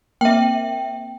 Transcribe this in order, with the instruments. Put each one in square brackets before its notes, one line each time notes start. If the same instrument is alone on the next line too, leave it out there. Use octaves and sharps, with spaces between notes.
[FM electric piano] A#3 C4 [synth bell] E5 G5